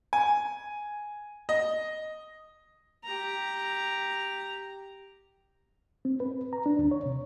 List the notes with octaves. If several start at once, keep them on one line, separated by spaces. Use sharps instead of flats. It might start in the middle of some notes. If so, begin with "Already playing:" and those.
G#5
D#5
G4 A#5
C4
B4
A#5
D4
D#2
C#5
C3